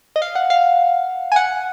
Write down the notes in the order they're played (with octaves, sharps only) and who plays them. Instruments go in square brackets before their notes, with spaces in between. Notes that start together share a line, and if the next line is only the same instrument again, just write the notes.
[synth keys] D#5
F5
F#5
F5
G#5
F#5